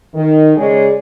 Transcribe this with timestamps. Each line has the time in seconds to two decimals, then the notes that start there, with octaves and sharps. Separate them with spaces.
0.15 D#3
0.57 C#3 G#3 G#4 C#5 D5